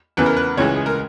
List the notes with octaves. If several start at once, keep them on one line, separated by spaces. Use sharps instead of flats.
E2 C#3 E3 B4
A#4
B4
C#2 C#3 E3 G#3 C#5
G#4
A#4